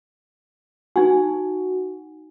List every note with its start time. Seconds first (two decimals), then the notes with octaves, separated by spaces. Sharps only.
0.96 D#4 F#4 G#5